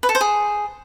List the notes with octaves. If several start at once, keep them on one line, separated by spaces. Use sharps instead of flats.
B4
A4
C5
G#4